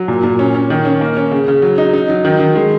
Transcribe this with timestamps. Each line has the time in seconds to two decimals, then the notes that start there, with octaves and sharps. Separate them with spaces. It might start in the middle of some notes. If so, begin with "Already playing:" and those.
Already playing: F#3
0.08 A#2
0.24 A#2
0.39 C#4
0.55 C#4
0.70 D#3
0.85 C#4
1.01 A#3
1.17 C#4
1.31 C#3
1.48 C#3
1.62 F#3
1.78 D#4
1.93 D#4
2.10 F#3
2.25 D#3
2.40 D#3
2.56 G#3